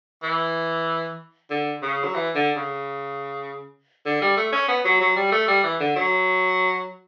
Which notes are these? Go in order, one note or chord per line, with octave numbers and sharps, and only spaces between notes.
E3
D3
C#3
F#3
E3
D3
C#3
D3
G3
A3
C#4
B3
F#3
F#3
G3
A3
G3
E3
D3
F#3